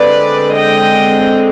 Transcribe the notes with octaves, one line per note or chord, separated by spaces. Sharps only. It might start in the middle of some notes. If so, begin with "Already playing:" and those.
Already playing: D3 G#3 C4 B4 D5
D#5 G5